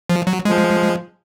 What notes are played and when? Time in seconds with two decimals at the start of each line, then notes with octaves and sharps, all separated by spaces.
0.09 F3
0.27 F#3
0.45 F3 G#3